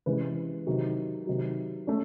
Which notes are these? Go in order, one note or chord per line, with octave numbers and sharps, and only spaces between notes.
C3 E3 G#3 C#4 B4
C3 D#3 F#3
C3 D#3 F#3
A3 C#4